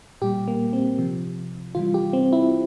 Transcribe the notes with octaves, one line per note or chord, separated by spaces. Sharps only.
A#2 G3 G4
A#3
C4
C3 F3
C3 E3 G3 F4
G4
C4
E4